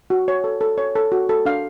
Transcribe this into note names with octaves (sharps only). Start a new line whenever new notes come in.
F#4
C#5
A4
A4
C#5
A4
F#4
A4
D4 F5